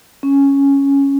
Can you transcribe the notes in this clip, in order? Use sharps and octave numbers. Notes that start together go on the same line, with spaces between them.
C#4